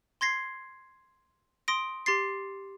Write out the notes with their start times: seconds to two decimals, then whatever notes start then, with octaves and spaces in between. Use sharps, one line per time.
0.21 C6 G#6 A#6 C7
1.68 C6 D#6 A#6 D7
2.06 G4 C6 A6 C7